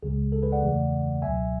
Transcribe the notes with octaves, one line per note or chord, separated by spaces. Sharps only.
C#2 C#3 G#3 G#4
A4
G#4 B4
D5 F#5
E2 C#3 E3 A3
C#2 B2 F#3 E5 G#5